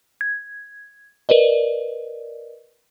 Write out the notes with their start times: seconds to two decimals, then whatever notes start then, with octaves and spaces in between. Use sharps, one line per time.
0.21 G#6
1.29 A#4 B4 D5 D#5